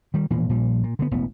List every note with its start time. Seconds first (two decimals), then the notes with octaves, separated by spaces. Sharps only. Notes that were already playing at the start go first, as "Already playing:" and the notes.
0.14 D#3 G3
0.30 E1 A#2 E3 F3
0.49 A#1 A#2 F3 G3
0.83 A#2
0.99 D3 D#3 B3
1.11 E1 A1 B3